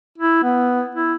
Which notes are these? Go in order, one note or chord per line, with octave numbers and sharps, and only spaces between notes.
E4
B3
E4